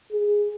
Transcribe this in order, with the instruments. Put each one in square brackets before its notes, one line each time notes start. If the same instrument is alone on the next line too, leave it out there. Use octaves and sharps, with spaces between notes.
[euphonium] G#4